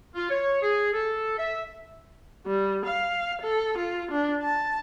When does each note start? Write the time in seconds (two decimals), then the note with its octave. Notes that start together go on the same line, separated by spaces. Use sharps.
0.15 F4
0.30 C#5
0.62 G#4
0.93 A4
1.38 E5
2.47 G3
2.86 F5
3.42 A4
3.78 F4
4.11 D4
4.43 A5